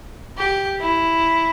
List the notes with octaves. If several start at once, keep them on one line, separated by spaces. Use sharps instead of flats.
G4
E4